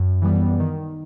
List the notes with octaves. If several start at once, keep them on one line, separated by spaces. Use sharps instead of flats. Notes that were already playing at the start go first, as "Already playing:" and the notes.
Already playing: F#2
E3 G3 B3
D#3